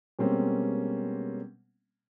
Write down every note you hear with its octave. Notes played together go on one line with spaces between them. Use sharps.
B2 G3 G#3 A#3 C4 C#4